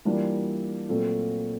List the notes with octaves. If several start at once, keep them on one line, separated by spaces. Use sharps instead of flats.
E3 G3 A#3 D4 F4
A#2 F#3 A3 C4 F4